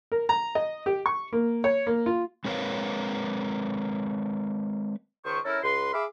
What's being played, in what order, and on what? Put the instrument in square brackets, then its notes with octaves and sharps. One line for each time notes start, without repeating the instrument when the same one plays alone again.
[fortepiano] A#4
A#5
D#5
G4
C#6
A#3
C#5
A#3
F4
[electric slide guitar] G#3 C4 A#4 B4 C#5 F5
[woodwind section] C#2 D#3 C5 C#6
C#4 E4 A4 A#4
C#2 B4 C6
G#4 E5 F5 B5 D6